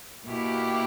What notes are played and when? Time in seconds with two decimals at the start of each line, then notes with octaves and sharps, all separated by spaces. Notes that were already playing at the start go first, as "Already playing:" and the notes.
0.26 B2 A#3 E4 G4